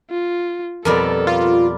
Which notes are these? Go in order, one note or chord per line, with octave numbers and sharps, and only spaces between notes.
F4
F2 B2 G3 A4 A#4 D5 B5
F4